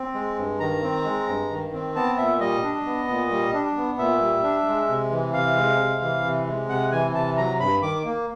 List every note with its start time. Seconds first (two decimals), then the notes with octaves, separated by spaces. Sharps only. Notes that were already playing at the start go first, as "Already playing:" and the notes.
Already playing: C4
0.14 G#3
0.37 G2
0.60 D#3 A#5
0.82 C4
1.05 G#3
1.28 G2
1.51 D#3
1.73 C4
1.95 B3 A5
2.18 A#2 E5
2.40 G3 D#5
2.63 D4
2.86 B3
3.08 A#2
3.31 G3
3.54 D4
3.76 B3
3.98 A#2 E5
4.21 G3
4.43 D4
4.66 G#3
4.89 C3
5.11 E3
5.34 C3 F5
5.56 G#3
5.79 C3
6.02 E3
6.24 C3
6.47 G#3
6.69 C3 F#5
6.92 E3 G#5
7.14 C3 A5
7.37 F#3 A#5
7.59 G2 B5
7.82 D#3 D6
8.05 A#3